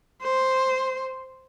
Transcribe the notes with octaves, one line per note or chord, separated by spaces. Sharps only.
C5